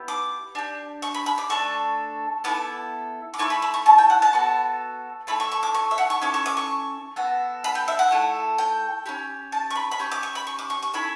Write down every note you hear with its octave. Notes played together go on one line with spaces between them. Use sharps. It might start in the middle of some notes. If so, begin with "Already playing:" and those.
Already playing: B3 E4 G4
D6
D4 G4
C#6
B5
B5
D6
A3 D4 A4 C#6
B3 E4 A4 D6
D6
A3 E4 A4 C#6
B5
B5
C#6
A5
G5
F#5
A5
B3 F#4 A4
A3 E4 A4 B5
C#6
C#6
D6
C#6
E5
F#5
C#6
C#4 E4 A4 D6
C#6
D6
C#6
B3 F#4 A4
B5
G5
E5
F#5
A3 E4 A4
G5
C#4 E4 G4
A5
C#6
B5
B5
C#4 G4 C#6
D6
C#6
B5
C#6
D6
C#6
C#6
C#4 E4 A4 B5